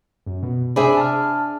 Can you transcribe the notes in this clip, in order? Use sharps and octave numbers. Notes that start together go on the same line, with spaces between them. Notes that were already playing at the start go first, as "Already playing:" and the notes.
F#2
B2
C3 D4 G#4 C5 E5 B5
A5 F6